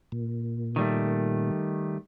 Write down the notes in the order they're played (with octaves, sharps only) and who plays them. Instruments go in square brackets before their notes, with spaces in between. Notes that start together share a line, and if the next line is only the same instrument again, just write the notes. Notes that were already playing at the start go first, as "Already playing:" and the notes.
[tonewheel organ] A#2
[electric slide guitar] D#3 G3 A3